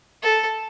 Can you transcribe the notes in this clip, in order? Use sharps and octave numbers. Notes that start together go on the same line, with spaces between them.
A4